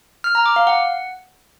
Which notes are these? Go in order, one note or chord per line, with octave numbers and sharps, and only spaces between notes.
F6
A#5
D6
F5
F#5